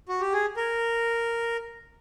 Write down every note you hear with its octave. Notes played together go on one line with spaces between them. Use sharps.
F#4
G4
G#4
A#4